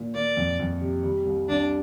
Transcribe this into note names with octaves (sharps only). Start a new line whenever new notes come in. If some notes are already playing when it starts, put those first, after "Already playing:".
Already playing: A#2
A#3 D5
F2
F2
C3
G3
C2
C2 D4